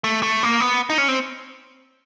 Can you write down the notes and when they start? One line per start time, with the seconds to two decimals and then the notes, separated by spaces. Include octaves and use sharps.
0.04 A3
0.23 A3
0.43 A#3
0.60 B3
0.90 D#4
0.98 C#4
1.08 C4